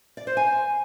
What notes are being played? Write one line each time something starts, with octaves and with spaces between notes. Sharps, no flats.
D5
C5
G#5